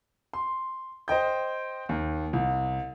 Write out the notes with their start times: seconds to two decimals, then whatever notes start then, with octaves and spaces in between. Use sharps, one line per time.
0.33 C6
1.08 C5 D#5 G5 G6
1.89 D#2
2.33 C2